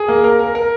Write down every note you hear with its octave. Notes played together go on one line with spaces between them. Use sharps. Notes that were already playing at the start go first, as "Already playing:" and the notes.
Already playing: G#4
A#3
A#4
A#4
A#4